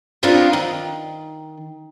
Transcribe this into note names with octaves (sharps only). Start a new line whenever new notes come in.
B3 C4 D4 D#4 F4 F5
D#3